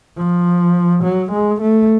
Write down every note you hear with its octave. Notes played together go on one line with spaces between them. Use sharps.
F3
F#3
G#3
A3